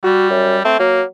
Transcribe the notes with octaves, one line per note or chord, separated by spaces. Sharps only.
G3 F#4
F#2
A3 C4
F#3 A#3